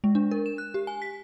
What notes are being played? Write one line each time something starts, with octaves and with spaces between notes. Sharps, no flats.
G#3
D4
A#4
E7
F#6
G4
G#5
B6